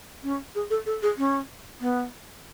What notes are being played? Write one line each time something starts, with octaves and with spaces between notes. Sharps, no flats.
C#4
G#4
A4
A4
G#4
C#4
B3